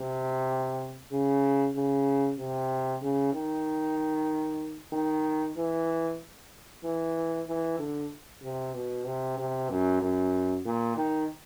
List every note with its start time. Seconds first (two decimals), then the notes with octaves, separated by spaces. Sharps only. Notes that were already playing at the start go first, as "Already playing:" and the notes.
Already playing: C3
1.12 C#3
1.75 C#3
2.39 C3
3.02 C#3
3.34 D#3
4.93 D#3
5.56 E3
6.84 E3
7.47 E3
7.79 D3
8.42 C3
8.74 B2
9.06 C3
9.38 C3
9.70 F#2
10.01 F#2
10.65 A#2
10.96 D#3